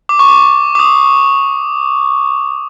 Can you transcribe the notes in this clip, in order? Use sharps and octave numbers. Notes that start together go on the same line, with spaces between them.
D6
C#6
D6
D6
D#6